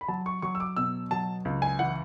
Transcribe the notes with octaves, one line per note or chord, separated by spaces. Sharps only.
B5
F#3 A5
C#6
F#3 C#6
E6
D6
B2 E6
F#3 A5
C#2
G#5
E3 F#5